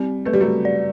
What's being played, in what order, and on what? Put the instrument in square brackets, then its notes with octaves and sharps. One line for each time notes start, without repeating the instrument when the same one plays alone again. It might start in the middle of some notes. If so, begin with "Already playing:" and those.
Already playing: [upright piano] G3 [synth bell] C4
[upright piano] A3 [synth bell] B4
[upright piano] G3
F#3 A3
[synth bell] D5